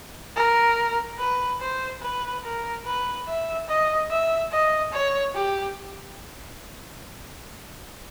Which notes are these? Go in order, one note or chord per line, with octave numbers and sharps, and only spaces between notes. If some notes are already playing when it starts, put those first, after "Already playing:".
A#4
B4
C5
B4
A#4
B4
E5
D#5
E5
D#5
C#5
G4